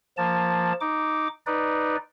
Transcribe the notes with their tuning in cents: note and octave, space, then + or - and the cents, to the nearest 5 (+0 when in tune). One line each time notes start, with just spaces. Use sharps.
F3 +0 A#3 +0 A5 +0
D#4 +0 D6 -5
D#4 +0 B4 +0 D5 +0